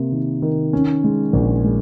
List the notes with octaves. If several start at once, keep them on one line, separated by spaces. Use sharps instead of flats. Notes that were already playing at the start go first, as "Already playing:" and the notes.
Already playing: C3 A#3
D#3
D#3
C#4
G#3
A#1
G#3